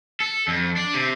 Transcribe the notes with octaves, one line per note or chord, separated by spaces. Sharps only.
A4
F2
D4
C3